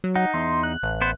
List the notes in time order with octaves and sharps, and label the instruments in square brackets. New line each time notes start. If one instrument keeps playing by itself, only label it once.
[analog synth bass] F#3
[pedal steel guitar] D#4 [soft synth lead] F#5
[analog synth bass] E2 [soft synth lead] C6
[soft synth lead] F#6
[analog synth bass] A1
[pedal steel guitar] B3 C5